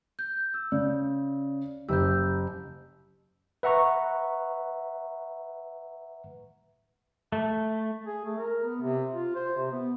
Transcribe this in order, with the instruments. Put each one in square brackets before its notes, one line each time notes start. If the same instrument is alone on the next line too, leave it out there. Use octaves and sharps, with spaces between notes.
[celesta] G6
E6
[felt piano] C#3 [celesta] D5
[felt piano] F#1 G4 [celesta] E6 G6
[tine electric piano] B4 E5 F#5 A#5 C#6
[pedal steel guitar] A3
[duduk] G#4
A3
A#4
B3
C3
F4
C5
C3
B3